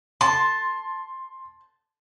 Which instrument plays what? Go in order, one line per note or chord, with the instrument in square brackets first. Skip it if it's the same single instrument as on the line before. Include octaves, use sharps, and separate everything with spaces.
[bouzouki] A5 [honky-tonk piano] C6